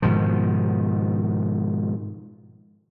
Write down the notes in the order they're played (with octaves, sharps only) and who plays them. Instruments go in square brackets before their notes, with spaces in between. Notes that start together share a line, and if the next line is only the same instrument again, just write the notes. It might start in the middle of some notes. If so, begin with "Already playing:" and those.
[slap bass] G#2 B2 D#3 F3